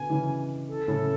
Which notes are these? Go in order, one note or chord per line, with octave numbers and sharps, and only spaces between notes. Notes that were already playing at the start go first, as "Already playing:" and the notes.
Already playing: B2 D3 G#5
C#3 E3
A4
A2 C#3